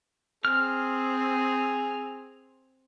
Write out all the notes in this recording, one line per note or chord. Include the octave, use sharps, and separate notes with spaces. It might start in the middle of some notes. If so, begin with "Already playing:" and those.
C4 G#4 F6